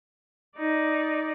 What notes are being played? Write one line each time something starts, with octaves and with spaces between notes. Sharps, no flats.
D#4 D5